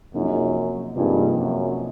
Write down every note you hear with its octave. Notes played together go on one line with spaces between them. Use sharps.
F#2 C3 F3 A#3 D#4 G#4
G2 C3 F3 A#3 D#4 G#4
F#2